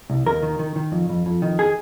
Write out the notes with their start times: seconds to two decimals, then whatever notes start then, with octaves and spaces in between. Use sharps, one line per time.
0.10 C2
0.26 D#2 A#4
0.43 D#3
0.59 D#3
0.76 D#3
0.92 F2
1.09 F2
1.26 F2
1.42 D#3
1.59 G#4